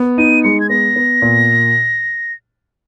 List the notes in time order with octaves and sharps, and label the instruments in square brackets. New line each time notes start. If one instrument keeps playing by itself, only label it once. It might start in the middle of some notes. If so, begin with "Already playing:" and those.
Already playing: [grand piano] B3
[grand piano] D#4 [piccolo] D#7
[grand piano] G#3 [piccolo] C#7
[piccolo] G#6
[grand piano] B3 [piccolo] A#6
[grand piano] B3
A#2